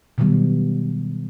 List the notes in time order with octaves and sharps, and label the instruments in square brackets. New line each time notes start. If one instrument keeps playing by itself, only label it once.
[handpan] B2 D#3 F#3 G3 B3